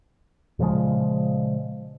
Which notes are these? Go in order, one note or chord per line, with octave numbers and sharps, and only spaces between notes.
A#2 C#3 F3 G#3